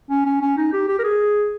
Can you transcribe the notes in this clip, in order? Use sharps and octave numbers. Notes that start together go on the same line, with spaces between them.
C#4
C#4
C#4
D#4
G4
G4
A#4
G#4